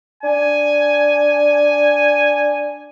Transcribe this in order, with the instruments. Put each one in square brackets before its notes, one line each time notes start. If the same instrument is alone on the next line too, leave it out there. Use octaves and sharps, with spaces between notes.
[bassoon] D4 [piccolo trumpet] G#5